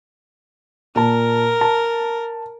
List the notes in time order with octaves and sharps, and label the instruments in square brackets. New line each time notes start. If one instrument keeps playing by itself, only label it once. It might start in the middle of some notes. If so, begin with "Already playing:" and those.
[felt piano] A#2 A5 [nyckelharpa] A#4
[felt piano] A5